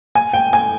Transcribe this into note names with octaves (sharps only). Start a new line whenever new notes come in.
G#5
G5
G#5